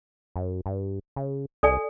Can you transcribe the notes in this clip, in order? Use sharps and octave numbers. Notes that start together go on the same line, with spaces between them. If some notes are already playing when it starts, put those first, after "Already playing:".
F#2
G2
C#3
C2 A4 D5 G#5